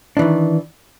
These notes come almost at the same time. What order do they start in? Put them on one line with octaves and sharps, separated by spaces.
D4 E3 D#3